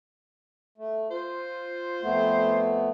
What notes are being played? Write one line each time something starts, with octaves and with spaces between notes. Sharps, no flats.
A3
F4 C5
F2 A3 B3